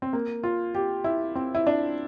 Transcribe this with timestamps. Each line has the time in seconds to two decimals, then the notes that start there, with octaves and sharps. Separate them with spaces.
0.02 C4
0.13 A#3
0.43 F4
0.75 G4
1.04 E4
1.35 C4
1.55 E4
1.67 D4